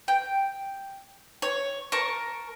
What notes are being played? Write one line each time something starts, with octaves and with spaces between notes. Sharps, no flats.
G5
C#5
A#4 A5 C#6